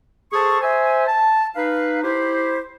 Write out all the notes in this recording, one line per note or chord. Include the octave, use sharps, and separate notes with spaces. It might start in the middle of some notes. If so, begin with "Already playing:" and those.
G#4 A4 C5 A5 C#6
C5 E5 G#5
A5
D#4 B4 F5
E4 G4 C5